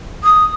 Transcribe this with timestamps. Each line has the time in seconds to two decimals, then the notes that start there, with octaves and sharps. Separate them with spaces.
0.24 D#6